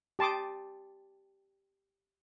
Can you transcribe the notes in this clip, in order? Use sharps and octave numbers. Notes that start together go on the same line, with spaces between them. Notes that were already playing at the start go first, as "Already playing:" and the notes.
G4 A5 C6 D6 D#6